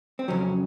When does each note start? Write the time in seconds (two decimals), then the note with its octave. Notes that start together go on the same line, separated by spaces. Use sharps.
0.19 C4
0.28 F2 C#3 F#3 C#4